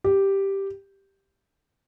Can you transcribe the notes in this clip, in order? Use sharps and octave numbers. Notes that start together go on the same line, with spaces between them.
G4